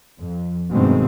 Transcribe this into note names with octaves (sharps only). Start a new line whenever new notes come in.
F2
G2 B2 D#3 G#3 A3 C4